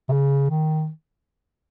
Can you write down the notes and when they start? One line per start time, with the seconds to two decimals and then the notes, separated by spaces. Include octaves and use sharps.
0.09 C3
0.12 C#3
0.50 D#3